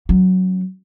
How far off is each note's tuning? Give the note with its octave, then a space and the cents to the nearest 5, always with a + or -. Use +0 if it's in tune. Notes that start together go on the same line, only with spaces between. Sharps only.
F#3 +0 C#4 +0